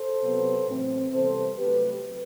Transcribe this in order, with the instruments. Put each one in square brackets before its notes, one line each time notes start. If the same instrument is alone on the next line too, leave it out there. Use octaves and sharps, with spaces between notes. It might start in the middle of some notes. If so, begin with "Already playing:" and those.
Already playing: [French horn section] A4 C5
C3 F#3 B3
A2 E3 A3 C4
C3 E3 G3 B3 A4 C5
C3 F#3 A3 G4 B4